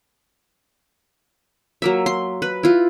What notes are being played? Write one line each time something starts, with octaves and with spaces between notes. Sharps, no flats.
F#3 A#3 E5
C6
B4
E4 F4